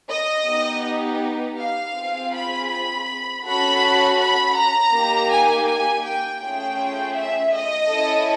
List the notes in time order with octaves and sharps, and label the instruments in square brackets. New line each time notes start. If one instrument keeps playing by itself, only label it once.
[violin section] D#5
B3 D#4 G4
F5
C4 F4 G#4
B5
B5
C#4 F#4 A4 B5
B5
A#5
A#3 D#4 G4
G#5
G#5
G5
A3 C#4 F4 G#4 G5
E5
D#5
C#4 E4 A4